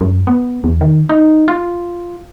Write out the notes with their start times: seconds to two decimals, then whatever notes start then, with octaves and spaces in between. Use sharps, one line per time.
0.01 F#2
0.27 B3
0.64 E2
0.81 D#3
1.09 D#4
1.48 F4